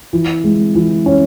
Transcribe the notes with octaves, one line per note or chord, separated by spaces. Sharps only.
E3
G#3
E3
C#4